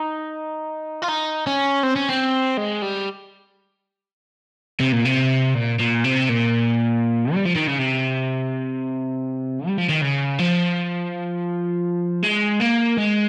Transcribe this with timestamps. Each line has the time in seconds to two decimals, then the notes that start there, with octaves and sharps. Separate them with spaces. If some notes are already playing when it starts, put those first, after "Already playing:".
Already playing: D#4
1.03 F4
1.09 D#4
1.47 C#4
1.83 C4
1.96 C#4
2.09 C4
2.57 G#3
2.82 G3
4.80 C3
4.92 A#2
5.05 C3
5.55 A#2
5.79 A#2
6.04 C3
6.29 A#2
7.34 G3
7.45 F3
7.55 D#3
7.67 C#3
7.78 C3
9.67 G3
9.78 F3
9.89 D#3
10.01 C#3
10.39 F3
12.24 G#3
12.61 A#3
12.98 G#3